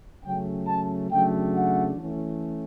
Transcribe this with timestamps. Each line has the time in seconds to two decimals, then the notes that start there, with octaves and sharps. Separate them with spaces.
0.22 C#3 F#3 A3 C#4 G5
0.65 A5
1.09 C#3 F#3 A3 D4 G5
1.53 F#5
1.97 E3 A3 C#4